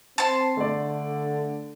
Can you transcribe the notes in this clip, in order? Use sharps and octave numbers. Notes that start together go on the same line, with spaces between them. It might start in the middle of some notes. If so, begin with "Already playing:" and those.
C4 A5 C6
D3 A3 D5